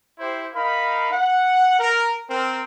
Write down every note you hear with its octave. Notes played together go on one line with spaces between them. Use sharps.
E4 G4 C5
D#4 A#4 F5 B5
F#5
A#4
C4 A#4